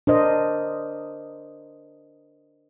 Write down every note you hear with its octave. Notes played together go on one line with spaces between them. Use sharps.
D4 A#4 C5 D#5